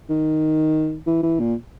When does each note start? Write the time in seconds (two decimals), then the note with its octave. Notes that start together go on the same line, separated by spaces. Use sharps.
0.09 D#3
1.07 E3
1.23 E3
1.40 A#2